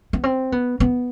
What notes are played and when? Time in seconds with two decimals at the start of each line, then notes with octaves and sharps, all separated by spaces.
0.13 B3
0.24 C4
0.52 B3
0.80 B3